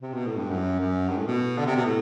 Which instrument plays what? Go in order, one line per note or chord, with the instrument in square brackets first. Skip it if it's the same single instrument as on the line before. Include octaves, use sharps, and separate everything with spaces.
[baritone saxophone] C3
B2
A2
G2
F#2
F#2
G2
A2
B2
D3
C3
B2
A2